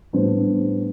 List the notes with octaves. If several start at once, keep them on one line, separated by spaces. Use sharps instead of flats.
A2 G3 B3 D4 C5